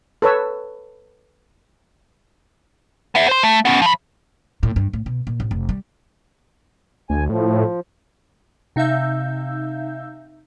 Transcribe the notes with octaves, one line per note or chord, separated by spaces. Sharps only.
A4 B4 C#5 E6
B3 E5
C5 C6
A3
B3 C#4
F3 B5
A2
G2
A2
B2
A#2
A1
F1
G3
D2 G#5
A2 F3
C3 D#4 E5 F5 E6 G6